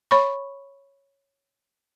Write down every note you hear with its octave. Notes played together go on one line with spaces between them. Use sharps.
C#5 B5 C#6